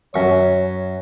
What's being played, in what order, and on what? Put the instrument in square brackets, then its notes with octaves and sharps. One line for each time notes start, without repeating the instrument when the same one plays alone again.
[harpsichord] F#2 C#6 [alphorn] C#5